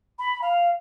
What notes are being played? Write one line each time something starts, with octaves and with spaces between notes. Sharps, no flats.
B5
F5